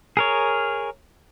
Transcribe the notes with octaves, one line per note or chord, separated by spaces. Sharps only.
G#4 A#4 C#5